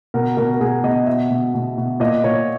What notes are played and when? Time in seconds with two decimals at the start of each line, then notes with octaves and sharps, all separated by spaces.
0.14 B2 A#4
0.37 B2 A#4
0.54 A#4
0.60 B2 G#4
0.83 B2 D#5
1.06 B2 E5
1.30 B2
1.54 B2
1.77 B2
2.00 A#2 D#5
2.24 A#2 C#5